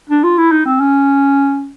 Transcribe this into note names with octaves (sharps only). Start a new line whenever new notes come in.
D4
F4
E4
D#4
C4
C#4